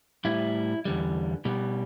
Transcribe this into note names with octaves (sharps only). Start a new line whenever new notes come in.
A2 G3 E4
E2 D3 G3
B2 G3